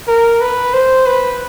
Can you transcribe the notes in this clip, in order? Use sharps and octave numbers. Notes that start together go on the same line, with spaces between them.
A#4
B4
C5
B4